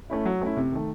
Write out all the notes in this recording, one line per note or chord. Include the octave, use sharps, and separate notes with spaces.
A3 C#4 E4
F#3
A3 C#4 E4
C3
D#3 A3